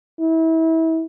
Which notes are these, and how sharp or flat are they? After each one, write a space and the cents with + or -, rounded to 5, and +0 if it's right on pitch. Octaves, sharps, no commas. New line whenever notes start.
E4 -30